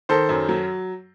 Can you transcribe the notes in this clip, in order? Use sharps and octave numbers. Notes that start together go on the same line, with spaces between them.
D#3 A4 C5
F#2
F#3